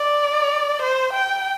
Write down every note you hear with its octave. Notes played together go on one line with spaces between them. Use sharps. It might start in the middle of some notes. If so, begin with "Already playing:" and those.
Already playing: D5
C5
G5